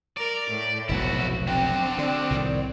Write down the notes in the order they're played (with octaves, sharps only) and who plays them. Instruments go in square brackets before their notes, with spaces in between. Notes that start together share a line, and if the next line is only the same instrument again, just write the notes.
[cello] A#4 [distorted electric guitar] D5
[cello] A2
[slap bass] F1 B1 [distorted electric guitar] E4 F#4
[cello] C4 [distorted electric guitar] D4 F#4 [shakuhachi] G5
[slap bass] D3 [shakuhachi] D5
[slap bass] C2 A2 D#3